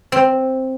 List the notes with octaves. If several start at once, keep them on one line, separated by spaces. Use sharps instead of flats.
C4